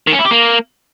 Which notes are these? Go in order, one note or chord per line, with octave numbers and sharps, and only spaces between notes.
D#3
C#4
E4
G4
A#3